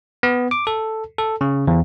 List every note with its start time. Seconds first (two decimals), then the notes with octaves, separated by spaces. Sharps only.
0.23 B3
0.51 D6
0.67 A4
1.18 A4
1.41 C#3
1.67 E2